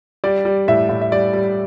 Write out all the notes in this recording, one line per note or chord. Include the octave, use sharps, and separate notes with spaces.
G3 D5
G3
A2 E5
A2
E5
G3 D5
G3